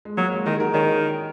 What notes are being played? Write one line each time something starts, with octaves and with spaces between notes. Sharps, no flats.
G#3
F#3 A#3
G#3
D#3 D#4 G#4
F#4 A#4
D#3 G#4 C#5